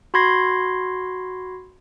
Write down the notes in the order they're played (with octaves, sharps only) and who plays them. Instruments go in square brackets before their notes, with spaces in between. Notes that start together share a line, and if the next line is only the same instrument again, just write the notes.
[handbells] F#4 B5 C6 G#6 A#6 C7